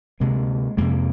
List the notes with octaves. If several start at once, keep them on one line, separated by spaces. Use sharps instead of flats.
D2 C3 G#3 A#3
F2 C3 G#3 A#3